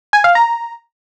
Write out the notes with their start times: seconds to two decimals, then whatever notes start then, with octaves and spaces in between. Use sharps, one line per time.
0.13 G#5
0.24 F5
0.35 A#5